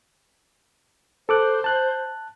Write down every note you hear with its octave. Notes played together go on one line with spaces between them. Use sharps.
A4 C5 D6 F#6
A5 F#6